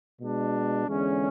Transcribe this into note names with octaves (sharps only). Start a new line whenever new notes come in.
B2 G#3 D4
E2 D3 G#3 C#4